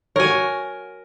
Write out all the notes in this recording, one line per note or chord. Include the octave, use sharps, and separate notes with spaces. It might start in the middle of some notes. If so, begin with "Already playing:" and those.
F#4 A#4 C#5 G#5